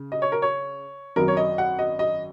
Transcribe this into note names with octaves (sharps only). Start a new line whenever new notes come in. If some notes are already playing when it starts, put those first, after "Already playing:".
Already playing: C#3
D#5
C#5
A#4
C#5
G#1 F#2 F#3 A#4
C#5
D#5
F#5
D#5
D#5